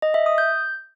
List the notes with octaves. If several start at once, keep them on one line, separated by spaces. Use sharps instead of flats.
D#5
E5
D#6
G6